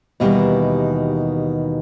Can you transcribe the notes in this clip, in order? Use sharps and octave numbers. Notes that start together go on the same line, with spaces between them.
D#2 B2 D#3 E3 G3